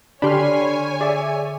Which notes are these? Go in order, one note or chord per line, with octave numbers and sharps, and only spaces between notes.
D3 D4 G4 C#5 G#5 B5 C6 F6
G#4 D5 E5